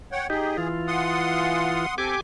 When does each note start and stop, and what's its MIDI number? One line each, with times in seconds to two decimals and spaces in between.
0.12 0.27 73
0.12 0.27 78
0.12 0.27 79
0.30 0.57 63
0.30 0.57 67
0.30 0.68 68
0.58 1.86 52
0.58 1.86 65
0.87 1.94 78
0.87 1.94 84
0.87 1.94 87
1.98 2.15 60
1.98 2.21 67
1.98 2.15 69
1.98 2.21 80
1.98 2.21 86